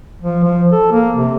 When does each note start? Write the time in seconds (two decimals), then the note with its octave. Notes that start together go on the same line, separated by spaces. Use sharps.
0.22 F3
0.43 F3
0.72 A4
0.92 A#3
1.16 C3